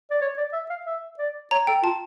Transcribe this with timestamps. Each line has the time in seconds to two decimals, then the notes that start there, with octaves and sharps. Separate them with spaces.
0.11 D5
0.21 C#5
0.38 D5
0.53 E5
0.70 F5
0.86 E5
1.19 D5
1.51 C#5 A#5
1.67 A4 G5
1.83 F4 A5